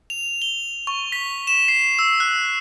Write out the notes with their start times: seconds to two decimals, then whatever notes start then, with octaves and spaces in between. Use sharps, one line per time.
0.10 F7
0.42 G7
0.87 C#6
1.12 B6
1.47 E7
1.68 C7
1.99 E6
2.20 F#6